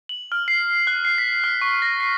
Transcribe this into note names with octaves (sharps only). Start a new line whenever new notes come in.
F#7
F6
C7
F#6
C7
B6
F6
C#6
A#6
C7